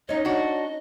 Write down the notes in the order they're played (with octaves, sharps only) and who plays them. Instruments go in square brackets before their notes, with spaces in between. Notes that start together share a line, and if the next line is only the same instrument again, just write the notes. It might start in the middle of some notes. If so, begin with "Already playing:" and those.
[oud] C#4 D#4 [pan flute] D#5
[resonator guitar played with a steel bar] D4 F#4